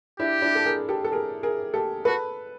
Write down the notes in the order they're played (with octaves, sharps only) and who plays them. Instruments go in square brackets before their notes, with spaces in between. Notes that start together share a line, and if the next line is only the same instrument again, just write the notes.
[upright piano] D4 E4 [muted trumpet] G4
[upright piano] D4 E4
A4
G#4 A#4
G4 A4
A4
G#4 A#4
G#4 A#4
G4 A4
[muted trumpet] F#4 [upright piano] A4 B4